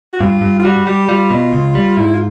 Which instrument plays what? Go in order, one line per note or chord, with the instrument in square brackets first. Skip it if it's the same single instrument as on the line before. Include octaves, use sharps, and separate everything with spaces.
[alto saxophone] F#4
[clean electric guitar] G2 [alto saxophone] F4
[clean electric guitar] G2
[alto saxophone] F4
[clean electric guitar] G3 [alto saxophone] F#4
[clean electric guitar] G3 [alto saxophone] G4
[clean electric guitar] G3 [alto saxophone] F4
[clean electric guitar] B2
C#2
G3
[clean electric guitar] G#2 [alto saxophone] E4
[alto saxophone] F4